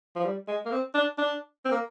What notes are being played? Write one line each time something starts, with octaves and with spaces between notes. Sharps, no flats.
F3
G3
G#3
A#3
C4
D4
D4
C4
A#3